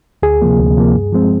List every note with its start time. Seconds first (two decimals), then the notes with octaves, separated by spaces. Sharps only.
0.23 D2 G#4
0.42 C3 F3 A#3
0.59 D2
0.77 C3 F3 A#3
0.95 G2
1.12 F3 G#3 C4